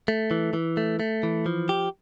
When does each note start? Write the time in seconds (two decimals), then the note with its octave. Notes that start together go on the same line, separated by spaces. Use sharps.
0.08 A3
0.31 E3
0.53 E3
0.77 A3
1.00 A3
1.23 E3
1.46 F3
1.69 G4